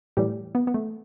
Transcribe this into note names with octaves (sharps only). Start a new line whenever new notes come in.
A2 E3 G3 G4
B3
B3
A3